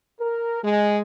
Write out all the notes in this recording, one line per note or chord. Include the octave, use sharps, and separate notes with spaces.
A#4
G#3